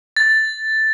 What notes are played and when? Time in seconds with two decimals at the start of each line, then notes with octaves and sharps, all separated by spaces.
0.17 A6